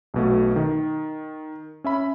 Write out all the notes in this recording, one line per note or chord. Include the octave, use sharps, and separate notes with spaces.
B1 B2 A3
D#3
C#4 E5 B5